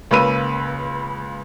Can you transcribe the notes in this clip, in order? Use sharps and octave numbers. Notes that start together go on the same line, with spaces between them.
C#2 C#3 A#3 B4 E6 D#7